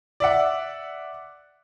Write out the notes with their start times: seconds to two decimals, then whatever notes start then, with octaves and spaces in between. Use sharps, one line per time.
0.20 D5 E5 F#5